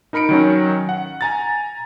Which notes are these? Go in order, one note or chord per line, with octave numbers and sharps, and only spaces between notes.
D#4 A#4 B5 C#7 D7
D#3 F#3 C#4
F#5
G#5 A#5 A6